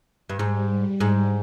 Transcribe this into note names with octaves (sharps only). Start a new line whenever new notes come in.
G2
G#2 G3
G#2